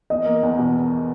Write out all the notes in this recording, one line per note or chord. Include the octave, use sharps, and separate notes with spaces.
E2 D#5
A#3
E2
B2